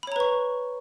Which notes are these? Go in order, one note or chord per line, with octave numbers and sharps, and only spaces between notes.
B4 C#5 A#5 B5 C#6